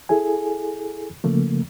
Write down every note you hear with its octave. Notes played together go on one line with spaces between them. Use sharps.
E4 G#4 A4 G#5
C#3 F3 A3 A#3